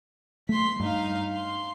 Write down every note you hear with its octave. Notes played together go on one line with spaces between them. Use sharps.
A3 C6 B6
G2 D#4 F5
C6